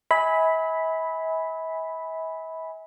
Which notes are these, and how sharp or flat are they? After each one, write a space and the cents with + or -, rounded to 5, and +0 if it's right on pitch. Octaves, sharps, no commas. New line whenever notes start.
E5 -40 G#5 +0 B5 +0